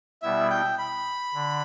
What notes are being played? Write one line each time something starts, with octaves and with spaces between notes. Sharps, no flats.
B2 G3 B3 E4 E5
G5
B5
D3